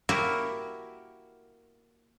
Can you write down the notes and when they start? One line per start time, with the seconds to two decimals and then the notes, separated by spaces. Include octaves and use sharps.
0.09 A#3 E4 F#4 G4 A#4